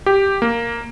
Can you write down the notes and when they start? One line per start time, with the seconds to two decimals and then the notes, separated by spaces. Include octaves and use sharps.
0.06 G4
0.42 A#3